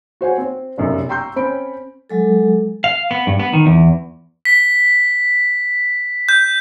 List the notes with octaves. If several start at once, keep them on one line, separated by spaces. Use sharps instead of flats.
F#4 C5 F#5 G#5
C4
F1 B1 F#2
G5 A#5 C6 C#6 E6 G6
C4 C#4 B5 D7
F#3 G#3 A4
F5
B3
G2
B3
D#3
E2
B6
G6